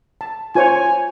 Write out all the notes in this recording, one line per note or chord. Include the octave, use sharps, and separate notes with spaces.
A5
F4 C5 C#5 G#5